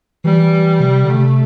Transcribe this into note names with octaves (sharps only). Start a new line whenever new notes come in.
E3 G3
C3
D3
C3 A3